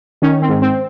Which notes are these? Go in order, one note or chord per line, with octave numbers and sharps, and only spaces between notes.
D#3 C#4
C4
G#2
C4